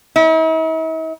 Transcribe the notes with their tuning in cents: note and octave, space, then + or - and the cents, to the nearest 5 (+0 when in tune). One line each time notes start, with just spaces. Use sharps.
E4 -45